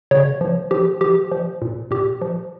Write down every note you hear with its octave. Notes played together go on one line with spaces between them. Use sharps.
C#3 C#5
F3
F3 G4
F3 G4
F3
A#2
A#2 G4
F3